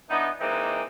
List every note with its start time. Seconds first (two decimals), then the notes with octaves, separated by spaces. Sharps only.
0.10 E3 B3 D4 D#4
0.41 E3 G#3 A#3 C4 D4 D#4